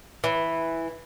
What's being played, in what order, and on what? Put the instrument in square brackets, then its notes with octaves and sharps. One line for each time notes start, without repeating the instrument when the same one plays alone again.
[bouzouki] E3